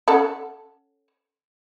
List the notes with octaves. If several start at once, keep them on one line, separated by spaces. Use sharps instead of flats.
C#4 A4 F#5